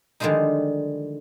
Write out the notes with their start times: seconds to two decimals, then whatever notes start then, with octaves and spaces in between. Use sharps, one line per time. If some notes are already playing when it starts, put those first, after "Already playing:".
0.20 D3 D#3 F3 G3 G#3 D#4